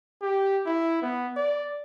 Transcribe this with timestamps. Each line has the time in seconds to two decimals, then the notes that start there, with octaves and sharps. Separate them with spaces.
0.22 G4
0.66 E4
1.02 B3
1.37 D5